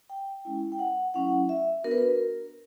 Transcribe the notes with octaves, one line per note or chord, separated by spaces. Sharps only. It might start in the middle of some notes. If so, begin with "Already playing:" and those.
G5
G#3 C#4 E4
G5
F#5
F#3 A3 C#4 E4 F#5
E5
B3 D4 F#4 A#4
B4
A#4